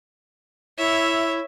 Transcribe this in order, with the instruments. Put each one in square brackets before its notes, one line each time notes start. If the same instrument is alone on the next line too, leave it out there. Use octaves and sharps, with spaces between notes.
[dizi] E4 [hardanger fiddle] C#5 E5